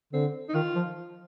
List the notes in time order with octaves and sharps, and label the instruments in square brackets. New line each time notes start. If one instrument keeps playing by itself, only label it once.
[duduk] D3 [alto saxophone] C4
[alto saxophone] D#4
[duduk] D#3 [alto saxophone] F4
[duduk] F3